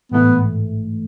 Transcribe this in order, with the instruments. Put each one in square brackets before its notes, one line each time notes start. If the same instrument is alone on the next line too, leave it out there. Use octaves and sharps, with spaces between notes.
[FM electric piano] A1 G#2 E3 A3 [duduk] B3